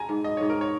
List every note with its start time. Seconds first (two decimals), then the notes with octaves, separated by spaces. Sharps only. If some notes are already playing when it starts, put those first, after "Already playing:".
Already playing: G#3 G#5 A#5
0.09 G#2
0.24 D#5
0.37 G#2 C#5
0.50 A#4
0.61 C#5